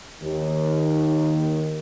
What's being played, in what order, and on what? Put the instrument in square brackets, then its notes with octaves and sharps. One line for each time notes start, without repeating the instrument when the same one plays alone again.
[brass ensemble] D#2 D#3